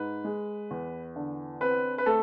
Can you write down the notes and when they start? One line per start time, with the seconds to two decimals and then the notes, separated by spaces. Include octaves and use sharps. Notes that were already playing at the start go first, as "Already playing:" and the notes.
Already playing: G#2 B4
0.24 G#3
0.70 E2
1.16 D3
1.61 C4 B4
1.98 B4
2.06 A3 A4